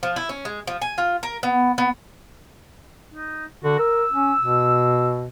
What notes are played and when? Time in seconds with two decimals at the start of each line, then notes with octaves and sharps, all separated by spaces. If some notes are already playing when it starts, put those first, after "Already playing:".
0.03 F3
0.16 E4
0.29 C#4
0.45 G#3
0.67 F3
0.82 G#5
0.98 F4
1.23 A#4
1.43 B3
1.78 B3
3.14 D#4
3.64 D3 F#4
3.78 A#4 E6
4.12 C#4
4.39 B2